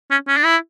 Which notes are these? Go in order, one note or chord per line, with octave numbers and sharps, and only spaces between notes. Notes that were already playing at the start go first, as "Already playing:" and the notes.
C#4
C#4
D4
E4